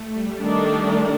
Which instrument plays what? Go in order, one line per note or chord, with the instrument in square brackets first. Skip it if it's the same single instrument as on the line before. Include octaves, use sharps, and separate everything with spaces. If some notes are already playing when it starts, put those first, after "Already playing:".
Already playing: [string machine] A3
G3
[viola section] D#3 A3 D4